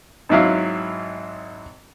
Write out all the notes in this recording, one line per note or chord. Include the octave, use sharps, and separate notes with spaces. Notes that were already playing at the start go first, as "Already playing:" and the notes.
G#1 G#2 F#3 E4 F5